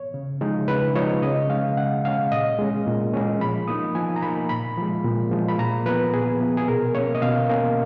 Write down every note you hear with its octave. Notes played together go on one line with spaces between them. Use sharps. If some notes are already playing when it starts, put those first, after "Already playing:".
Already playing: C#5
C#3
F3 G#3 D#4
C#3 B4
F3 G#3 D#4 C#5
C#3 D#5
G#3 C#4 F5
C#3 F#5
G#3 C#4 F5
A#2 D#5
G#3 C#4
A#2
G#3 C#4
F3 B5
A#3 D#4 D#6
F3 G#5
A#5
A#3 D#4 B5
A#2 B5
F3 G#3
A#2
F3 G#3
B5
A#2 A#5
F3 B3 B4
A#2 G#4
F3 B3
G#4
B2 A#4
A#3 C#4 C#5
D#5
B2 F5
A#3 C#4